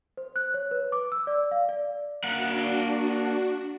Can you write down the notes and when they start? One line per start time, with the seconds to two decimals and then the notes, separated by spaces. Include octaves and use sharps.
0.17 C5
0.36 F#6
0.54 C#5
0.71 B4
0.92 D6
1.12 E6
1.27 D5
1.51 F5
1.69 D5
2.24 A#3 D4 F#4 F#5